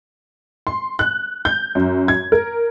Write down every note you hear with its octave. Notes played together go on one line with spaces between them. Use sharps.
C6
F#6
G6
F#2
G#6
A#4